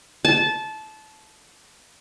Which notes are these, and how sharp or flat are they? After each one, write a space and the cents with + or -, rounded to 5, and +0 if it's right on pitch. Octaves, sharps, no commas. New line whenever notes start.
A5 -20